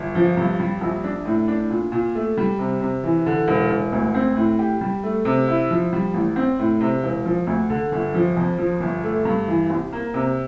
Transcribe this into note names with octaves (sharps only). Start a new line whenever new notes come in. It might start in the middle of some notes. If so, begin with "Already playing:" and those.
Already playing: G1
F3
G2
G3
A#1
D4
A2
D4
A#2
A#2
A3
G3
C3
C3
E3
D3
E1
E1
D2
C4
A2
G4
G3
A3
C3
E4
F3
G3
A1
C4
A2
C3
E1
F3
D2
D3
G1
F3
F2
F3
G1
A3
G2
E3
C2
A#3
C3